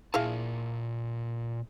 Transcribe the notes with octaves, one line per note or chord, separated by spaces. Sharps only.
A#2 E4 G#4 F5 A5